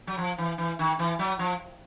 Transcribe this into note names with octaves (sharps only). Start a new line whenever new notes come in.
F#3
F3
E3
E3
D#3
E3
F#3
F3